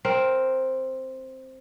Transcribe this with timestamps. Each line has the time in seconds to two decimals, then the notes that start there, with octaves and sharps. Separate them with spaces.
0.05 C4 A#4